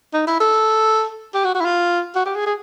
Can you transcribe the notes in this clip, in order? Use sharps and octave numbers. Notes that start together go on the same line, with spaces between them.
D#4
E4
A4
G4
F#4
F#4
E4
F4
F#4
G4
G#4
G#4